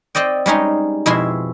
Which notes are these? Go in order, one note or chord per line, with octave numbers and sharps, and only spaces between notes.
C4 D5 D#5 G5
G3 G#3 C#4 D#4
F2 B2 G#3 E4 E5 C6